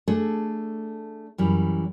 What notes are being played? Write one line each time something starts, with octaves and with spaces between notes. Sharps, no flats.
A3 D4 G#4 A4
F#2 E3 G3